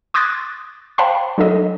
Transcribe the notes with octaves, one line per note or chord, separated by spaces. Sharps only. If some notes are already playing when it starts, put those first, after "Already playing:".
C6 D6 D#6 F#6 G#6 A6
C5 F5 G5 A5 B5 C6
F#3 D4 A4 D#5